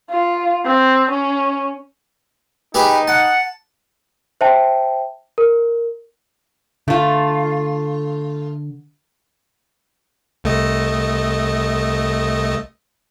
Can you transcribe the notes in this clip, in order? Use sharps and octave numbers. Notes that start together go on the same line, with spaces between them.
F4
C4
C#4
D#4 G4 G#4 B4
F#5 A5
C5 E5 G5 A5
A#4
D3 A3 F4
C2 A3 D#5